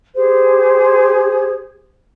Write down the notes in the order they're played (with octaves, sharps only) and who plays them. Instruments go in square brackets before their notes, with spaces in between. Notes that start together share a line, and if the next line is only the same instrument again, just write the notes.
[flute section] G4 G#4 C5